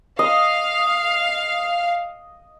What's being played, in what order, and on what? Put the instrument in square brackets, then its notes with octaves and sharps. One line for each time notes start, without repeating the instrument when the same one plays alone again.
[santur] D#5 [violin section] F5